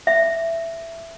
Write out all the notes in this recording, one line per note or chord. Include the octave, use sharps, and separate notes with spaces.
E5